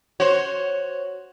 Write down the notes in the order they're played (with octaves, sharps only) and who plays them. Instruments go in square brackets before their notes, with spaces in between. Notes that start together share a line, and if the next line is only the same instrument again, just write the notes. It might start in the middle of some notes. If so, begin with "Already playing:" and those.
[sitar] F#4 C5 [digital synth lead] C#5